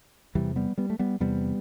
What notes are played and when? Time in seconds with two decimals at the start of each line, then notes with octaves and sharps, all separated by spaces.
0.35 E2 C3 E3 G3
0.56 G3 B3
0.78 G3 B3
0.90 A3
0.99 G3 B3
1.20 E2 C3 G3 B3